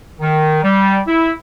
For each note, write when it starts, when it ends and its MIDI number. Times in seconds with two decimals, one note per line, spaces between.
0.20 0.59 51
0.63 1.00 55
1.07 1.31 64